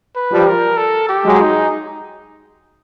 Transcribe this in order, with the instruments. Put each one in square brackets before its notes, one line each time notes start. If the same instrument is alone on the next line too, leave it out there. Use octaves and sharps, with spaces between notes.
[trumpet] B4
[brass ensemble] F3 G3
[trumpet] A#4
A4
G4
[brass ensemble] F#3 G#3
[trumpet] D#4